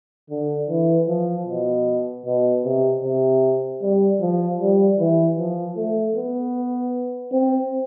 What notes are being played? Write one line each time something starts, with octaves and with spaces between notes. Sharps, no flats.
D3
E3
F3
B2
B2
C3
C3
G3
F3
G3
E3
F3
A3
B3
C4